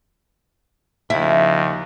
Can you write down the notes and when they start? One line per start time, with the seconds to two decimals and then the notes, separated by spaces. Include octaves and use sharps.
1.10 D#2 C#3 F3 E4